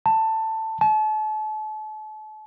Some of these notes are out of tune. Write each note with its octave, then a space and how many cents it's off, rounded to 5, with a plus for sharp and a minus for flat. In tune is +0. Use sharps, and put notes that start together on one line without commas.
A5 +10
A5 -40